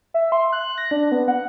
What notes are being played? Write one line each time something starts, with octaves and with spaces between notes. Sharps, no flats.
E5
C6
F#6
A#6
D4
B3
F#5